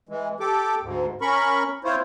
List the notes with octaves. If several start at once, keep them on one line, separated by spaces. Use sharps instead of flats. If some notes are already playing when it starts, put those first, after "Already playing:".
E3 G#3
G4 A4 D6
D2 G#2
C#4 A#4 B5 C#6
C4 E4 F4 C5 C#5